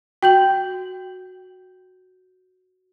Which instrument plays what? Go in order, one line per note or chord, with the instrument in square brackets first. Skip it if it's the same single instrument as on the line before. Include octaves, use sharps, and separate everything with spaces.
[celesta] F#4 G6 F#7 [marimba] G5